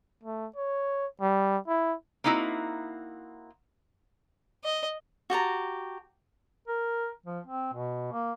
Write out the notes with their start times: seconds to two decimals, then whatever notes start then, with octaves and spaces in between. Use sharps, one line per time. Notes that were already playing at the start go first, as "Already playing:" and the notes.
0.23 A3
0.56 C#5
1.21 G3
1.68 E4
2.24 A#3 C4 D#4 E4 F#4
4.64 D#5
5.30 F#4 G4 A5 A#5
6.68 A#4
7.26 F3
7.47 C4
7.73 B2
8.12 A#3